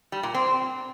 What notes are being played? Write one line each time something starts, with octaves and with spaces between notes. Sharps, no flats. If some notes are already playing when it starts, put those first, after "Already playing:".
G3
A#2
C4